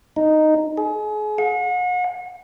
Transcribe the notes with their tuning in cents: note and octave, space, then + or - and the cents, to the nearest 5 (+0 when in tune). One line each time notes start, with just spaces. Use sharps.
D#4 -5
G#4 +35
F#5 -40